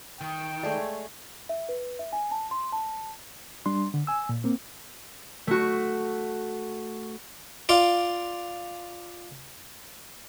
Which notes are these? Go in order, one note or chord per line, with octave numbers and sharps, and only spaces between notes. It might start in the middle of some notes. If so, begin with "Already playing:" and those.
D#3 G5
G#3 A3 C#5 D5
E5
B4
E5
G#5
A5
C6
A5
G3 D4 C6
D3
G#5 E6
A#2
A#3 C4
A3 F#4
F4 D5